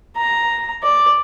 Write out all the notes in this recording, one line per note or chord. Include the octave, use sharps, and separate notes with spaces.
A#5
D5